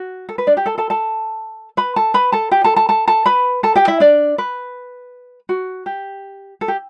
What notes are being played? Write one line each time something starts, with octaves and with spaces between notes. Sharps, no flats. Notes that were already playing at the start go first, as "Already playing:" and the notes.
Already playing: F#4
A4
B4
D4 D5
G4 G5
A4 A5
A4 A5
A4 A5
B4 B5
A4 A5
B4 B5
A4 A5
G4 G5
A4 A5
A4 A5
A4 A5
A4 A5
B4 B5
A4 A5
G4 G5
E4 E5
D4 D5
B4
F#4
G4
A4
G4